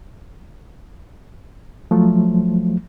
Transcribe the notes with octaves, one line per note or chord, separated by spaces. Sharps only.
F3 F#3 A3